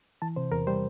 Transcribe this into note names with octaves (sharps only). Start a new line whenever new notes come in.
E3 A5
C3 C5
E2 A#4
G3 C5